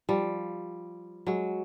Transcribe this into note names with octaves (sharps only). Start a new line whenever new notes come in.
F3 G3
F#3 G#3